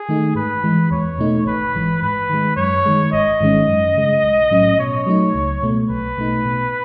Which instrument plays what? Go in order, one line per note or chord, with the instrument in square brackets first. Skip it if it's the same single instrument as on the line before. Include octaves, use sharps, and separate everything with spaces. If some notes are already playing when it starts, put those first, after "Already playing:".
Already playing: [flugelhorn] G#4
[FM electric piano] D#3 A3 D#4
[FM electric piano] G#2 [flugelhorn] B4
[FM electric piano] E3 G#3
[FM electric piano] E2 [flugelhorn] C#5
[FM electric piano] B2 A3 D#4
[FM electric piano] G#1 [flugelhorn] B4
[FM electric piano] G#2 E3 G#3
[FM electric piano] G#2 [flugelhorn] B4
[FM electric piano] D#3 G#3
[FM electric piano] F#2 [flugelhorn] C#5
[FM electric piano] D#3 G#3
[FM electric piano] G#1 [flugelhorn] D#5
[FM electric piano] G#2 D#3 G#3 C#4
F#2
C#3 G#3
B1
A2 F#3 C#4
[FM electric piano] B2 [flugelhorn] C#5
[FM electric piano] F#3 A3 D#4
C#2
B2 A3
[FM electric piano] B1 [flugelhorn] B4
[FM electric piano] B2 A3 D#4
B2